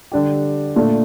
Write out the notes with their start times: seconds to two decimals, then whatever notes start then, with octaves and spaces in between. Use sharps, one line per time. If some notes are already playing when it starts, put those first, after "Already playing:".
0.12 D3 G3 D4 G4
0.76 A#2 A3 D4